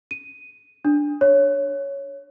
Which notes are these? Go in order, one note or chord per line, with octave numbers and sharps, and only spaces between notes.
D#7
D4
C#5